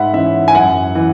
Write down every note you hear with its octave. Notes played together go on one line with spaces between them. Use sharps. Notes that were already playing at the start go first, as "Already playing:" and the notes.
Already playing: G#2 E5 F#5 B5
E3 C#4 E5
G#5
F#2 F#5
E3